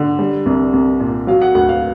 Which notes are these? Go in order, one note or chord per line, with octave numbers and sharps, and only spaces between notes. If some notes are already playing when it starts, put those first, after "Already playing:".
Already playing: D3
G3
C2
C2
A#2
F#3 F5
F#5
D2 F#5
F5